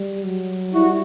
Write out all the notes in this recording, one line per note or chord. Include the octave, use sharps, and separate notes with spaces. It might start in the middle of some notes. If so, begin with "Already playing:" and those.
Already playing: G3
F#3
G3 E4 F#4